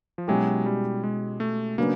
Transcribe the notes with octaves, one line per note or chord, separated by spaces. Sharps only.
F3
B2 F#3 G#3 C#4 E4 G4
G3
G#3
A3
C#3 F#3 A#3 B3 D4